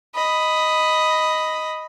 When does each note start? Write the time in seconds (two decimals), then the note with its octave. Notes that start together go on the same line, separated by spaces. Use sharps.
0.15 D#5 B5